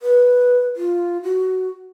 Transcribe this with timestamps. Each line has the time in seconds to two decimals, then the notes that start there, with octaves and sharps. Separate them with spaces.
0.02 B4
0.76 F4
1.23 F#4